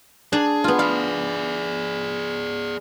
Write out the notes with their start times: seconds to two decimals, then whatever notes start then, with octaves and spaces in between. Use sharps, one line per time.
0.33 D4 G#4
0.64 B3 F4
0.79 G#4 D5 F5